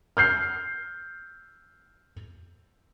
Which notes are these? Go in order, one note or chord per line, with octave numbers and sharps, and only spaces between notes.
F6 G6 C7